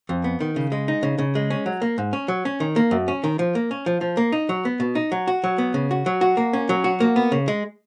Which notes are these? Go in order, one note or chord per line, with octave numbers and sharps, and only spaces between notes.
F2
B3
D#3
C#3
G#3
D#4
C#3
C#3
G#3
C#4
F#3
A#3
G#2
C#4
F#3
C#4
D#3
A#3
F#2
C#4
D#3
F3
A#3
C#4
F3
F3
A#3
D#4
F#3
B3
B2
D#4
F#3
F#4
F#3
B3
C#3
F#4
F#3
F#4
A#3
C#4
F#3
F#4
A#3
B3
C#3
G#3